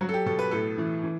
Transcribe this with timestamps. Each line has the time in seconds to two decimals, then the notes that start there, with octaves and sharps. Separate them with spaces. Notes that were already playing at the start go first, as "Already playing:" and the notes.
0.01 F#3 F#4
0.09 A4
0.14 G4
0.26 B2 A4
0.39 B4
0.51 A2 A4
0.78 E3
1.03 E3